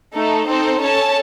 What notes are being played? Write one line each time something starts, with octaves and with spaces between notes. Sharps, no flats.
A3 D#4 A4
C4 D#4 A4 C5
C#4 A4 C#5 A5